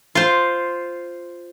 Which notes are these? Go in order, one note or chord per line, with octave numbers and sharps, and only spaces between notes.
F4 C5